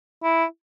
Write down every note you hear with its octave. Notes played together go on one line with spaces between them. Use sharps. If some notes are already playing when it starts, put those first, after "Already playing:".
E4